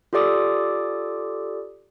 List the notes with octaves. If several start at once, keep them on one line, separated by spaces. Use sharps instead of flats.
F4 G4 A4 D5 D6 D#6